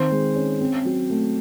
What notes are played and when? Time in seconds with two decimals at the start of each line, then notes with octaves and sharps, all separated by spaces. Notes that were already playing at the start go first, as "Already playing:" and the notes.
Already playing: D#3 C4 C5
0.11 G#3
0.36 C#4
0.61 C4
0.85 F#3
1.10 A3